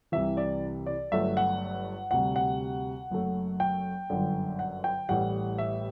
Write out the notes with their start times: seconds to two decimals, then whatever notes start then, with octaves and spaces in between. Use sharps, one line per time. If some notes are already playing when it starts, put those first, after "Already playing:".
0.12 C2 C3 E3 E5
0.37 D5
0.86 D5
1.12 G1 G2 F#3 A3 E5
1.37 F#5
2.11 D2 C3 G3 F#5
2.36 F#5
3.10 F#1 F#2 F#3 A3
3.60 G5
4.10 G1 F#2 D3
4.59 F#5
4.84 G5
5.09 A1 A2 G3 F#5
5.58 E5